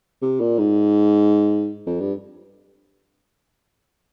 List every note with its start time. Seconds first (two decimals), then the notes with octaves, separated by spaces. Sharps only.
0.22 C3
0.40 A#2
0.59 G#2
1.86 F2
2.01 G2